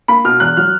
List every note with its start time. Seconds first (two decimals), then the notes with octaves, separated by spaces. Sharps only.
0.08 A#3 B5
0.25 B2 F6
0.40 E2 F#6
0.57 F#3 F6